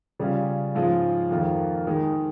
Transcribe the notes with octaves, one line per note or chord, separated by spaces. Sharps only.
C#3 G3 C#4 F4
G#2 F3 G#3 C#4 F4
F2 D#3 A#3 F4
D#3 G#3 D#4